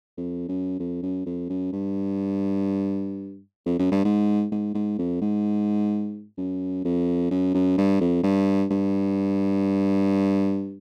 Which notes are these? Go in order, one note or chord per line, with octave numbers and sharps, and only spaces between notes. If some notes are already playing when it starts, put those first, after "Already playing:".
F2
F#2
F2
F#2
F2
F#2
G2
F2
F#2
G2
G#2
G#2
G#2
F2
G#2
F#2
F2
F#2
F#2
G2
F2
G2
G2